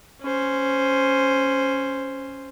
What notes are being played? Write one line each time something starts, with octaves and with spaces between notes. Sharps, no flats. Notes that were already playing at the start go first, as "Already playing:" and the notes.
C#4 C5